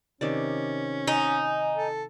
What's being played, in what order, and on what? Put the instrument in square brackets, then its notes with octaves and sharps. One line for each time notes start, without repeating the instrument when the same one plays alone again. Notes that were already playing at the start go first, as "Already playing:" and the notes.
[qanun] C3 D#3 D5 [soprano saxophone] C#4
[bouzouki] D#4 [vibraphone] G#5
[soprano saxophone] A4